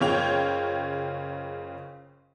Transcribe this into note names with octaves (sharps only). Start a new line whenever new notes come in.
F#1 C#3 F4 C#5 G5 F7